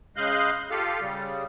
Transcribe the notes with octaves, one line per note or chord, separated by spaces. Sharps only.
C#3 G#3 D#5 F5 F#6 G6
F4 G4 A4 F5
C#3 G3